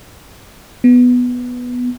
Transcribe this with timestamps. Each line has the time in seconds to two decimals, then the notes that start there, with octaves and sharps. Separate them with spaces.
0.84 B3